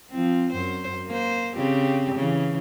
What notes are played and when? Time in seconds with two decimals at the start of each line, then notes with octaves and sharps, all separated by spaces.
0.10 F3 C4
0.52 F#2 C5
1.06 A#3 C5
1.56 C#3 C4 G4
2.15 C#3 E3